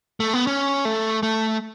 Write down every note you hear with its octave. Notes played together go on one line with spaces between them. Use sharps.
A3
B3
C#4
A3
A3